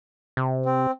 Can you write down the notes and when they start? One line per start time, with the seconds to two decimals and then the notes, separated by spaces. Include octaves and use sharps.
0.37 C3
0.66 C4